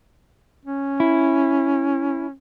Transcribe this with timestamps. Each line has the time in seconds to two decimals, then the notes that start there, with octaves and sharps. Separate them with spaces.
0.65 C#4
1.00 E4